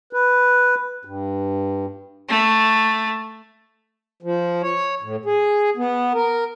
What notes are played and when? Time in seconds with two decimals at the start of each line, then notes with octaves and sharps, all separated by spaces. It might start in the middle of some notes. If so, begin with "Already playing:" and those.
0.13 B4
1.05 G2
2.29 A3
4.23 F3
4.62 C#5
5.02 A2
5.25 G#4
5.77 B3
6.14 A#4